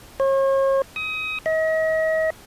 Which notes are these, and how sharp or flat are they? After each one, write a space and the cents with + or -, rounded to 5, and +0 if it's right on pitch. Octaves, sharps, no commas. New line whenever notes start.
C#5 -40
D#6 +25
D#5 +40